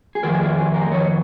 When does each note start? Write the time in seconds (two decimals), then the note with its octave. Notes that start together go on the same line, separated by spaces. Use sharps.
0.15 G#4
0.23 F2 D#3 A#4
0.41 G#4
0.57 G#4
0.74 A#4
0.91 F2 D#3 C#5